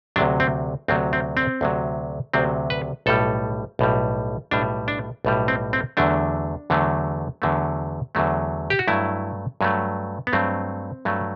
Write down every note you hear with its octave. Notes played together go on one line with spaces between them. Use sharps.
D2 C3 F#3 D4
C4
D2 C3 F#3 C4
C4
C4
D2 C3 F#3
D2 C3 F#3 C4
B4
B1 A2 G3 A4
B1 A2 G3
B1 A2 G3 D4
D4
B1 A2 G3
C4
C4
E2 D3 F#3 A3 D4
E2 D3 F#3 A3
E2 D3 F#3 A3
E2 D3 F#3 A3
G4
F#4
G2 F#3 A3 E4
G2 F#3 A3
B3
G2 F#3 A3 C4
G2 F#3 A3